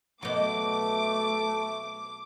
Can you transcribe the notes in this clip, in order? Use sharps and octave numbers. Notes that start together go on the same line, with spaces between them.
B2 F#3 A3 D6